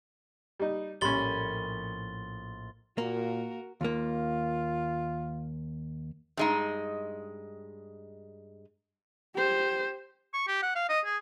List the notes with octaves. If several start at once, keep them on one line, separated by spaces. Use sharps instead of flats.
G3 D#4
A#1 A2 G3 C#4 B5 C6 A6 G7
A#2 A#3 F#4 A#4
D#2 A#3 F4
G2 G#3 D#4
G4 C5
C#6
G4
F#5
F5
D#5
G#4